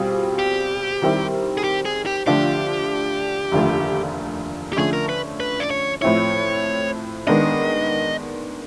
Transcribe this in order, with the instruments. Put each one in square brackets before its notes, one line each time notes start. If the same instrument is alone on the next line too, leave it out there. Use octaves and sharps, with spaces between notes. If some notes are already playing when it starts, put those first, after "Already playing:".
Already playing: [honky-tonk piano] B2 G3 C4 F4 G#4
[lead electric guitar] G4
[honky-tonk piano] D#3 G3 C4 E4
[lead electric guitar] G#4
G4
G#4
G4
[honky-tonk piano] D3 F3 A3 D4 F4 [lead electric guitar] G4
[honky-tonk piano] F1 D#2 D3 F3 A3
[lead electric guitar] G4
[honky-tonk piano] D3 F3 A3 C#4 [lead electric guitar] G#4
[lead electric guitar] A#4
B4
B4
D5
C#5
[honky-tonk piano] A2 F3 A3 C4 E4 [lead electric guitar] C#5
[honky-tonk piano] D#3 G#3 B3 D4 [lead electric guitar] D#5